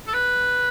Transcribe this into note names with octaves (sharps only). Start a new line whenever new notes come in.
A4
B4